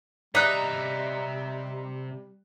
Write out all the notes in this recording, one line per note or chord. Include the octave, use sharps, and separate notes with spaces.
C3 G3 D#4 D5 E5 A#5 F#6